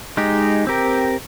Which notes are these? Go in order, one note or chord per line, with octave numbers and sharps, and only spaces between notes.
G#3 D#4 G4
C4 G4 A#4